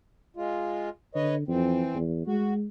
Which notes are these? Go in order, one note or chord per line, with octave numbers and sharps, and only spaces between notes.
G#3 F4
D3 B4 C#5 D#5
F2 E3 C4
E2
G#3 F#4